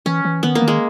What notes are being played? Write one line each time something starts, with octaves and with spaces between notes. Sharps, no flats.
E3 C#4
E3
D#3 B3
A#3
D#3
G#3